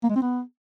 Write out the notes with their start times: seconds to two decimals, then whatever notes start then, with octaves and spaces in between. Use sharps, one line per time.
0.03 A#3
0.10 G#3
0.16 C4
0.22 B3